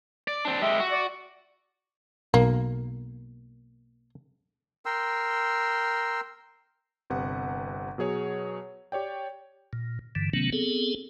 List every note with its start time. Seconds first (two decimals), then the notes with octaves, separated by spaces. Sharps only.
0.28 D5
0.45 C4 D4
0.62 G#3 G4 E5
0.80 F#4
0.92 D5
2.34 B1 A#3
4.86 A#4 G5 C6 E6
7.10 G1 C3 B4 F#5
7.98 B2 F#3 G#4 C#5
8.92 G4 C#5 D5 G5
9.73 A#2
10.15 G2 D3 E3
10.33 C3 D#3 F#3 A3 B3 C#4
10.52 B3 C4 G#4 A4